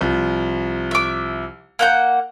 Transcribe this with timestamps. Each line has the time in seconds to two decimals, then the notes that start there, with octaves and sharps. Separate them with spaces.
0.01 C2 F3
0.91 E5 D6
1.79 A#3 F#5 G6